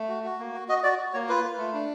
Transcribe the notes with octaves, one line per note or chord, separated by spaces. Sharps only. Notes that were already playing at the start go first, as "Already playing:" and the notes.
Already playing: A3
F#4
F#4
A#3
F#4
F#4 D#5
F#4 D5
F#4
A#3 C#5
F4 B4
F4
A3
D4